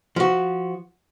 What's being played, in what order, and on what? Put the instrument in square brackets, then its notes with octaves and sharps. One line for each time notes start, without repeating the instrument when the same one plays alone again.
[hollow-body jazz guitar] F3 F#4